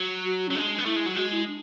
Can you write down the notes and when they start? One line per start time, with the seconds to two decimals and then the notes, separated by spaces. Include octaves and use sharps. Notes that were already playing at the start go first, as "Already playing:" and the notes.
Already playing: F#3
0.25 F#4
0.48 F#3 C#4
0.55 G#3 D4
0.79 B3
0.85 A3 E4
0.96 G#3
1.06 F#3
1.16 G#3 F#4
1.32 E4
1.47 D4